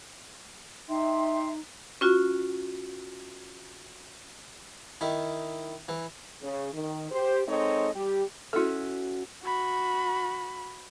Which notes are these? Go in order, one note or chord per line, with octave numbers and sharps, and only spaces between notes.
D#4 E5 G5 C6
C#4 F4 F#4
D#3 E4
E3
C#3
D#3
G4 C5
G#3 C4 D#4 A4 C#5 D#5
G3 G4
C#4 E4 F#4 A4 E5
F#4 B5